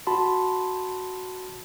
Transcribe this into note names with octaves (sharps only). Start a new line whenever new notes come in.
F#4 A5 B5 C6